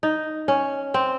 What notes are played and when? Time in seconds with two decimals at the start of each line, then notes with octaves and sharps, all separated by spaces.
0.03 D#4
0.48 C#4
0.94 C4